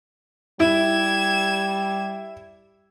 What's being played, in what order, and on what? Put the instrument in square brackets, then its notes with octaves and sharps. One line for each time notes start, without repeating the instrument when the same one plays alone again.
[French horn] G3 [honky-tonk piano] E4 [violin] G#6 E7